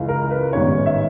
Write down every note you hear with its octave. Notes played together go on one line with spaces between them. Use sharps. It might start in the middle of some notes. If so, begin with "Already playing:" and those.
Already playing: C#2 C#3 E3
A#4
B4
A1 G#2 D#3 G3 B3 C#5
E5